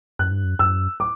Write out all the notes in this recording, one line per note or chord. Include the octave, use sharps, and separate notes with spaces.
F#2 F#6
G2
F#2
F#2 E6
D6